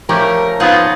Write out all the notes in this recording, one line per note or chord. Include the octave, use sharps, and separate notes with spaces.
F3 A3 C#4 G4 A#4
F3 B3 D#4 F4 G#4 F#5